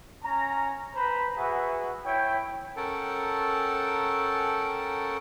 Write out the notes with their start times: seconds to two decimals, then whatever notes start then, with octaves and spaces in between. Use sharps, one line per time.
0.23 C#4 A#5
0.95 B4 C5 A#5 B5
1.37 F#4 G#4 B4 E5 F#5
2.04 E4 C#5 G5
2.77 C#4 A4 A#4 F#5 G5 A5